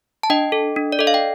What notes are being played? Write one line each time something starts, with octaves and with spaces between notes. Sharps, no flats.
A5
D4 D#5 G5
A4
D4
D5
A4 D#5
F5
G5